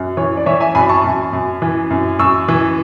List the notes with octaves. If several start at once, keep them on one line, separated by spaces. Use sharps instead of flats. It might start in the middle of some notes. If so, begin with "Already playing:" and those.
Already playing: F#2
E3 C#5
D5
E3 C#5 E5
E5 G#5
F#2 G#5 B5
A5 C#6
F#2
F#2
E3
F#2
F#2 C#6 E6
E3